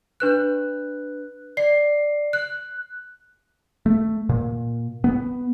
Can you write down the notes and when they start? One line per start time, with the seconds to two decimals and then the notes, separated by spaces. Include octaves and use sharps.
0.20 D4 B4 F#6
1.57 D5 C7
2.33 F#6
3.86 A3
4.29 A#2
5.04 B3